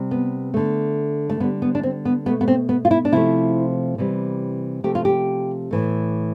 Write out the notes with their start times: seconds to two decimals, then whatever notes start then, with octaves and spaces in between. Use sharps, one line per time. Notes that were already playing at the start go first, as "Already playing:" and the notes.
Already playing: C3 G3
0.11 B3
0.54 D3 A3
1.30 A3
1.40 D3 G3 B3
1.62 B3
1.75 D4
1.83 C4
2.05 B3
2.26 B2 A3 B3
2.41 B3
2.48 C4
2.69 B3
2.85 F4
2.91 E4
3.05 D4
3.12 C3 F3 A3 E4
3.98 C3 E3 G3
4.84 C3 F3 A3 G4
4.95 F4
5.05 G4
5.71 A2 E3 A3